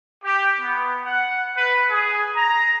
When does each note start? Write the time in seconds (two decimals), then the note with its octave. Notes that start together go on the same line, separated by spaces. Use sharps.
0.24 G4
0.60 B3
1.04 F#5
1.56 B4
1.91 G#4
2.36 A#5